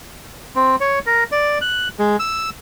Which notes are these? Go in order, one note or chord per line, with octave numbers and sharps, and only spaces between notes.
C4
C#5
A#4
D5
F#6
G#3
E6